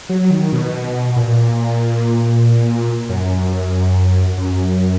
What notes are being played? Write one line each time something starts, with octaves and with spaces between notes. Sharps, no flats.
F#3
D#3
B2
A#2
F#2
F#2